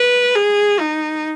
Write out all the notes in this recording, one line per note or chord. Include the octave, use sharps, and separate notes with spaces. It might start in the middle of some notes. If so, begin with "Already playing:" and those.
Already playing: B4
G#4
D#4